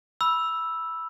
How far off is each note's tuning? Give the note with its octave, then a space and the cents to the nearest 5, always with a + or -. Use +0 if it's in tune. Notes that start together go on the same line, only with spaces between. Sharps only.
B5 -10 E6 +0